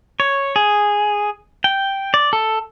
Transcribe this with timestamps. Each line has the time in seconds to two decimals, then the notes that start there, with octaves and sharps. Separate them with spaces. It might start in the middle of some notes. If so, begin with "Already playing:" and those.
0.20 C#5
0.56 G#4
1.64 G5
2.14 D5
2.33 A4